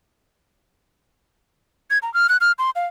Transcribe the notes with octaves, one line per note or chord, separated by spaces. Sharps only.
G#6
A#5
F6
F#6
F6
C6
F5